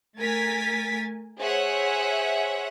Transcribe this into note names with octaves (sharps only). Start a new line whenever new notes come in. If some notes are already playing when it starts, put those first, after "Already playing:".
A3 A#4 G#5 G#6 A6 B6
G#4 C5 C#5 E5 F#5